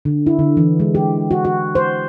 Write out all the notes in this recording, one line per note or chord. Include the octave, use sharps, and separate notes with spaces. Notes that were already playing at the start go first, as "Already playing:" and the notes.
D3
E4
D3
E3
G#3
G4
F#4
F#4
C5